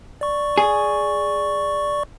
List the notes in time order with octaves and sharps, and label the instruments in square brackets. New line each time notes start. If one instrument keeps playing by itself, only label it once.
[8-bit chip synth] D5 C#6
[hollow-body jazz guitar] G#4